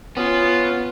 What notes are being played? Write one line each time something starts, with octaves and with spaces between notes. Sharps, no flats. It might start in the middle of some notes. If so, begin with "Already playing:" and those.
B3 C#4 F4